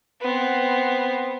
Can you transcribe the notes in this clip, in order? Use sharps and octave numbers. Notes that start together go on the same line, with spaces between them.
B3 C4